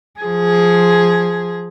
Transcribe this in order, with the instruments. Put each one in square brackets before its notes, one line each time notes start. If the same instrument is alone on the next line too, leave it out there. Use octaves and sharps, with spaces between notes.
[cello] F3 G#4